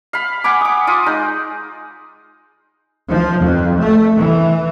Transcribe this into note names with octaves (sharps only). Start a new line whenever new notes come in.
F5 B5
F#5 G#5 B5 D6
D6 D#6
F4 D#6
G#3 D#4
F3
F2
A3
E3